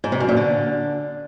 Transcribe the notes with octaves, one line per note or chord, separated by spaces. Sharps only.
G#2
C3
F#2
A#2
D3